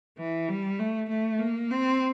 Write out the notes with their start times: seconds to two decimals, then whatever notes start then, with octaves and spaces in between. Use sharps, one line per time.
0.18 E3
0.49 G3
0.79 A3
1.09 A3
1.39 A#3
1.70 C4